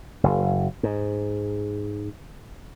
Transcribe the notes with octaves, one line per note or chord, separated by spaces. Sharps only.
F#1
G#2